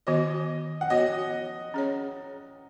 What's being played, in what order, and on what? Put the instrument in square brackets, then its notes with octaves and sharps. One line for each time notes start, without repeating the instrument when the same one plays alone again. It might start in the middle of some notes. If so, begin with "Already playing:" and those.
[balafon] D#3 B3 F#4 [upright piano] D#5
[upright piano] F#5
[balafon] B3 F#4 C#5 [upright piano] D#5
[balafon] C#4 G#4 C#5